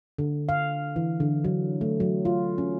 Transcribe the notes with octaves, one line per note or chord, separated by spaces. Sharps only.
D3
F5
E3
D3
F#3
A3
F#3
F4
C#4